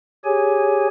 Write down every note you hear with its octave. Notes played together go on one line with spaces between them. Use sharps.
G4 G#4 C#5 G#5